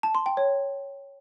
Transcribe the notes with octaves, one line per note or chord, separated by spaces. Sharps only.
A5
C6
G5
C#5